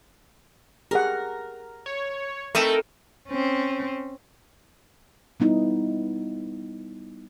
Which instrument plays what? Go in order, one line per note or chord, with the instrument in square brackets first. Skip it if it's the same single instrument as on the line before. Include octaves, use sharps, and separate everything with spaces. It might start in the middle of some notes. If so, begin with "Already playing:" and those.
[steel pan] G4 G#4 F#5 [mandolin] A#4
[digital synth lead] C#5
[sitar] A3 [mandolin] C4 D#4 E4 [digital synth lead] A#4
[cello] C4 C#4
[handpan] G3 B3 D#4 E4